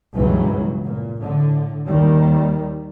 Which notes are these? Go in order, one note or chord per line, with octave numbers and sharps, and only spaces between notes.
C#2 G2 B2 E3 F#3
A#2
A2 D3
D#2 D#3 G3